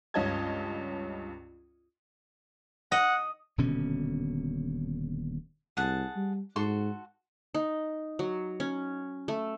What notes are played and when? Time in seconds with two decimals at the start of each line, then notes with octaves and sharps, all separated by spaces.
0.14 C#2 G2 C#4 D#5 A5 G#6
2.92 D#5 F#5
3.58 D#1 B2 D3 C#4
5.77 C2 G#4 F#5 A5
6.16 G3
6.56 G#2 F#4 A4 C6
7.54 D#4
8.19 F#3
8.60 C#4
9.28 A3